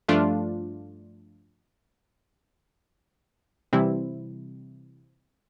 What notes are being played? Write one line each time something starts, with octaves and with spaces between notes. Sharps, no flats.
G2 F3 A3 D4 F4
C3 E3 G3 C4 E4